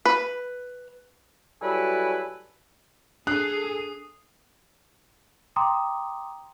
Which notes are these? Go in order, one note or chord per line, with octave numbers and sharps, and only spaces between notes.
B4
F#3 G3 E4 A4 B4 G#5
D4 G#4 A4 D#6 F#6 C7
G5 A#5 C6 D6 D#6